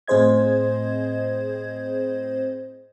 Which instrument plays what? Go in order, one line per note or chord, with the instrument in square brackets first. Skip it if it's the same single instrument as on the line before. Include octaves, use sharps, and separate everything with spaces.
[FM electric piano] A2 C4 G#4 C5 D#5 G#6